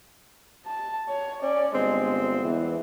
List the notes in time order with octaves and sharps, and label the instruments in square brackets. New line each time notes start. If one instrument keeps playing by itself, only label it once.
[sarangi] A5
C#5
[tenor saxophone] C#4 [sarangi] D5
[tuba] G1 [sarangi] G#3 [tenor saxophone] C4
[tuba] E2 [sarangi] E3